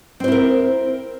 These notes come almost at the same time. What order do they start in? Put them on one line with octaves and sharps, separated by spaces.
C4 C5 E4 A#4